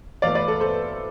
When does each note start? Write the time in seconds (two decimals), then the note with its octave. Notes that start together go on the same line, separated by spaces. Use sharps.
0.22 E2 B2 A3 D5 F5
0.35 B4 D5
0.48 A4
0.60 A4 C5